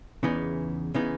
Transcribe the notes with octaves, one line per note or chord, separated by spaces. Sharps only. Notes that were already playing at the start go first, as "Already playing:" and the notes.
E2 C#3 E3 B3 D#4
C#3 E3 B3 D#4